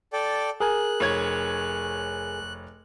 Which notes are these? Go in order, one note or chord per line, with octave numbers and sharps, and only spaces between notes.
A4 D5 G5
G#4 A#4 G#5 F#6
F1 C#5 G#6